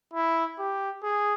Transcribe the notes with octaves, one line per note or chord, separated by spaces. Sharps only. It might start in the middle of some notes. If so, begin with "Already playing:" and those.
E4
G4
G#4